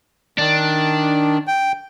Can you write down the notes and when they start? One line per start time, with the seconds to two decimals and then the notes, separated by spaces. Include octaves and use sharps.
0.38 D#3 D4
1.47 G5